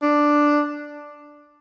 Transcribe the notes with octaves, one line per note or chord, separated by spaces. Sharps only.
D4